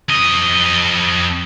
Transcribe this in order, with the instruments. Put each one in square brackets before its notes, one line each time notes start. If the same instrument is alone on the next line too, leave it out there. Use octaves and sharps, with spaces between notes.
[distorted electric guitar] F2 D#5